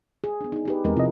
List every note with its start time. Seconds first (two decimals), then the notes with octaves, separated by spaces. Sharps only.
0.24 G#4
0.41 B3 D4
0.52 D#4 G#4
0.65 D#4 G4 B4
0.85 E2 G#3 C4 G#4 A#4
0.96 C3 F3 E4 F4 D#5